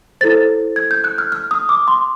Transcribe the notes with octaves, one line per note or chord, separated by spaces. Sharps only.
E4 A4 C5 A6
G#6
G6
F#6
F6
F6
D#6
D6
C6